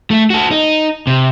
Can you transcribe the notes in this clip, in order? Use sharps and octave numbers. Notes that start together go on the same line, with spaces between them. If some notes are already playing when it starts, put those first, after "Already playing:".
A3
F#4 A4
D#4
C3